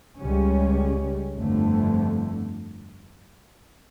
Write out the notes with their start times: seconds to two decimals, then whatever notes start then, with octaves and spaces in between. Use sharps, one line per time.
0.18 C#2 C#3 G3 C#4
1.36 G1 F2 D3 A3